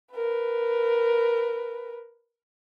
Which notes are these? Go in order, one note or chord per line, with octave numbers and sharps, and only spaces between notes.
A#4 B4